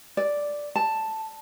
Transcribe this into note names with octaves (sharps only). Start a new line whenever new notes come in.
D5
A5